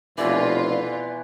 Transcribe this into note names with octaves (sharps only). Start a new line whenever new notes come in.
F1 B2 E3 F4 D5